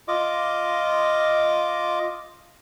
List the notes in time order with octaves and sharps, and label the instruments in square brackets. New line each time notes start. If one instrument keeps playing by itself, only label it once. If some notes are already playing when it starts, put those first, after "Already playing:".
[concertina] F4 D#5 D6